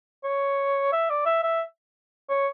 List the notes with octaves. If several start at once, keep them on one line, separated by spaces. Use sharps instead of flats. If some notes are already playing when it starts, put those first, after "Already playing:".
C#5
E5
D5
E5
E5
C#5